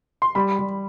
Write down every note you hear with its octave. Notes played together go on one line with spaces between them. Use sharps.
C6
G3 B5
G3